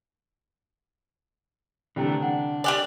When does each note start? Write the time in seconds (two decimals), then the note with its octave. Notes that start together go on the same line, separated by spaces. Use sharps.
1.96 C2 D3 E3 A3 D4 D5 G5 A#5
2.22 D4 F#5
2.64 G3 G4 D5 G#5 F#6